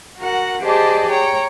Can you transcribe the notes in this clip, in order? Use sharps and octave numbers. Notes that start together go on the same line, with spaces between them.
F#4 A#4 F#5
G4 G#4 C5 D5 D#5 A5
C#5 G5 A#5